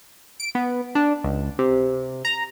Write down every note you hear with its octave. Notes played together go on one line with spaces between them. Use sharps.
D7
B3
D4
C#2
C3
A#5